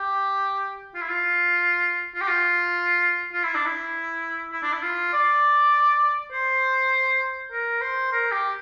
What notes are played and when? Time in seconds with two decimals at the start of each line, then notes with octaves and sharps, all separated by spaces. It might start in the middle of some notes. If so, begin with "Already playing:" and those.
Already playing: G4
0.94 F4
1.02 E4
1.09 F4
2.14 F4
2.21 G4
2.28 F4
3.33 F4
3.44 E4
3.55 D4
3.66 E4
4.52 E4
4.63 D4
4.72 E4
4.82 F4
5.13 D5
6.32 C5
7.51 A#4
7.81 C5
8.12 A#4
8.31 G4